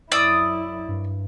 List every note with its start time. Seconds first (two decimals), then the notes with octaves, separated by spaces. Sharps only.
0.12 F#2 E4 D5 D#6 E6
0.88 G2